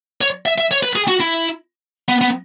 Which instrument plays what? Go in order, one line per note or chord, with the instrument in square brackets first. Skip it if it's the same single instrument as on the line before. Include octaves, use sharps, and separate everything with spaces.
[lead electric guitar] C#5
E5
E5
C#5
B4
G#4
F#4
E4
B3
B3